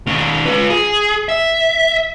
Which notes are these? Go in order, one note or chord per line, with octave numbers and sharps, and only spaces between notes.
D#3 C#4
F4 B4
G#4
E5